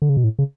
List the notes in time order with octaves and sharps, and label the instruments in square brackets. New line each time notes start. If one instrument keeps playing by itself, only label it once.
[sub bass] D3
C#3
B2
A2
C#3